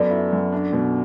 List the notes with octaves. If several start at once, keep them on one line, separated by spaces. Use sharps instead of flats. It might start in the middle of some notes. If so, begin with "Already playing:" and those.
Already playing: F#2 B3 A4 D5
E4
F#2
D4
B2